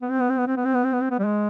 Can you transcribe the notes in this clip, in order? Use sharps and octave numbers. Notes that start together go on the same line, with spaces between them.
B3
C4
B3
C4
B3
C4
B3
C4
B3
C4
B3
C4
B3
G3
G#3